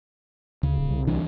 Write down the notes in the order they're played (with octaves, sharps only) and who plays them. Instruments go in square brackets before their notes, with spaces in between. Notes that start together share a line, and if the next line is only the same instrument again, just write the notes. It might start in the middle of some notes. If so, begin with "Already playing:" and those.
[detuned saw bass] D2 [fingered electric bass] C#3
[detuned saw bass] D1
C2
[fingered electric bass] D2 E3 D4